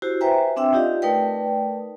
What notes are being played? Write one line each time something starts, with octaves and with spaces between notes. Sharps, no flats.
E4 F#4 G4 C5
B4 C5 E5 G5 G#5 A#5
C4 D4 E5 G5 E6
D#4 F4 G4 D5 D#5 F5
A3 D#4 A#4 B4 D5 G5